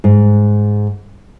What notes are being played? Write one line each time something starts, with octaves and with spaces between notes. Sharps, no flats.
G#2